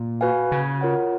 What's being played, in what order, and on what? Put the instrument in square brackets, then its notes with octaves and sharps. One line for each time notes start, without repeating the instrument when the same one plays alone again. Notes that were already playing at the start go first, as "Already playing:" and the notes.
Already playing: [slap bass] A#2
[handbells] F#4 B4 F5 G#5
[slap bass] C#3
[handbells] F4 A#4 C#5 F#5